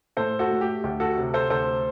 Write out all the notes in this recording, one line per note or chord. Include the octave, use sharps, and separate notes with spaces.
A2 A4 C5
F#4 A4
A3
G4
D2 G4
F#4 A4
C3
A4 C5
D2 A4 C5